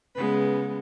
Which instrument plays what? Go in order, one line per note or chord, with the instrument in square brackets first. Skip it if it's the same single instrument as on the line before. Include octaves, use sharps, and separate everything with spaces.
[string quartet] C#3 G#3 B3 B4